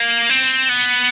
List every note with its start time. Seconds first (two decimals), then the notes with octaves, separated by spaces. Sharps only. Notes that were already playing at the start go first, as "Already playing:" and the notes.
Already playing: A#3
0.30 C4
0.69 B3